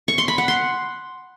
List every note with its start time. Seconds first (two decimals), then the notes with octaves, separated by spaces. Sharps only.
0.08 C#6
0.18 C6
0.28 B5
0.38 F#5
0.48 C6